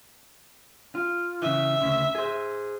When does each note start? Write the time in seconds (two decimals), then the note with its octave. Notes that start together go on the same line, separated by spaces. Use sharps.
0.95 F4
1.42 C#3 E3 E5
1.81 D2 C#3
2.15 G#4 C5